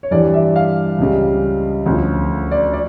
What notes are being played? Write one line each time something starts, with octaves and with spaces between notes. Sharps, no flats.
C#5
G2 E3 G3 D5
E5
F5
C#2 C#3 G3
D2 C#3 F3
D5
D5